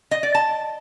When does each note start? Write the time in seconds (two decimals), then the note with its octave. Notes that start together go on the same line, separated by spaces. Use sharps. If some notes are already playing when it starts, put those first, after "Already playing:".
0.11 D#5
0.23 D5
0.35 A5